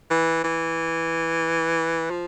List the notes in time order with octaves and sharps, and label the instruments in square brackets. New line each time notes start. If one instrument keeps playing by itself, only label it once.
[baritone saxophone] E3
E3
F3